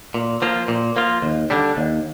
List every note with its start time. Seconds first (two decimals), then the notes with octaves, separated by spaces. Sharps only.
0.14 A#2
0.42 F3 A#3 F4
0.68 A#2
0.96 F3 A#3 F4
1.22 D#2
1.50 D3 G3 D4
1.77 D#2